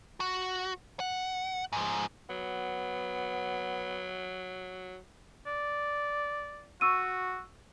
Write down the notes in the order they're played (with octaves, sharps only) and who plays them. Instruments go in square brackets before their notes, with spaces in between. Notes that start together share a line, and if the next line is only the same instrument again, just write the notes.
[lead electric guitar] F#4
F#5
G#2 F3
[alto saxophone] F#3 [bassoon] B3
[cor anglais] D5
[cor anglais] F#4 [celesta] C#6 E6 D#7